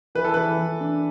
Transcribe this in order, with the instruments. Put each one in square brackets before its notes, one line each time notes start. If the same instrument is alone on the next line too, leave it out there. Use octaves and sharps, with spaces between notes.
[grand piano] E3 [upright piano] B4
[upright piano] A4
[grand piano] E3 [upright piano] B4
[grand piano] E3
D4